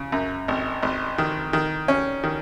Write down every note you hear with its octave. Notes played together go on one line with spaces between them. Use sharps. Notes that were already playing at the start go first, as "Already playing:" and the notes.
Already playing: C#3
F#2
G#1
G#1
D#3
D#3
C#4
D#3